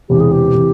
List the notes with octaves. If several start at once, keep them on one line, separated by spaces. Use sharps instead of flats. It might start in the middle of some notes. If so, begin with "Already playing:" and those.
E1 E2 C3 E3 G4
G#4
G4
C3 E3